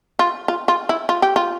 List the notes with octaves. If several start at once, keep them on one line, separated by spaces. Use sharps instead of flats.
F4
F4
F4
E4
F4
G4
F4